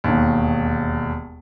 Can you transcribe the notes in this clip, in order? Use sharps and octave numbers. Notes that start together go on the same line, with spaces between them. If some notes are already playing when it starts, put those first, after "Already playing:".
E1 D#2